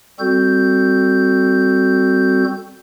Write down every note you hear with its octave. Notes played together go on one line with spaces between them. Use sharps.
G3 C4 F#4 A4 G6